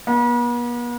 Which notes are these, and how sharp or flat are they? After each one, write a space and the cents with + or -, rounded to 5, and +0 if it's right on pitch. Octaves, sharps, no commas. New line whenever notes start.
B3 -45